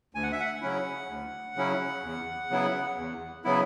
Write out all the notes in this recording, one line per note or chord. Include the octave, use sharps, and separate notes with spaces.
D2 G#5
F#5
E5
F#5
C#3 F#3 C#4 E4
D2
C#3 F#3 C#4 E4
E2
C#3 F#3 B3 E4
E2
C#3 F#3 B3 E4